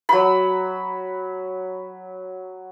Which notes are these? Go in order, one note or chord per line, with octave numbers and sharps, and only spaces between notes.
F#3 B5